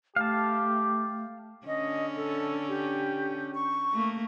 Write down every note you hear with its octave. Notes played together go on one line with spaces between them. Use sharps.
A3 G4 F5 A5
D3 C#4 D#5
A4
G4
C#6
A3 A#3